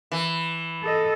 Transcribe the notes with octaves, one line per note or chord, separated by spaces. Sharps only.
E3
A4 D#5